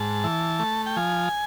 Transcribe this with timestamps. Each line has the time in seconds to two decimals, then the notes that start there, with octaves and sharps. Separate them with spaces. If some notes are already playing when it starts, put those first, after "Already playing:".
Already playing: G#2 A5
0.24 E3
0.59 A3
0.86 G5
0.96 F3 G#5